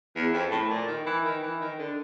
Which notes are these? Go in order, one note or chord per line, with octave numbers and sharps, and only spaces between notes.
E2
F2
A2
A#2
D#3
E3
D#3
E3
D#3
D3